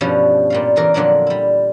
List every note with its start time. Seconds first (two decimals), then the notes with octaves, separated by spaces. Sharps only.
0.01 G2 B2 F3 G3 C#4
0.50 A#2 G3 F5
0.76 C#3 E3 A#4 D5
0.94 F2 A#2 D3 F#3 D4
1.27 G3 E4